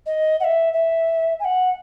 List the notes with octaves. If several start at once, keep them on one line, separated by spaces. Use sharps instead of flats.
D#5
F#5
E5
E5
G#5
F#5